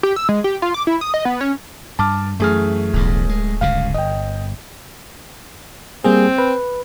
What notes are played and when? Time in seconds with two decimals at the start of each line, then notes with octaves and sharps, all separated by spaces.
0.03 G4
0.16 E6
0.29 G#3
0.44 G4
0.62 F4
0.74 D6
0.87 E4
1.01 D#6
1.14 D#5
1.25 B3
1.41 C#4
1.99 G2 A5 D6 F6
2.40 F#2 E3 A3 G#4 F6
2.94 D1 B1 E2 G2
3.29 G#3
3.61 G1 C#2 C#3 F5
3.94 G1 D#5 G5
6.05 G3 A#3 C4 G#4
6.38 B4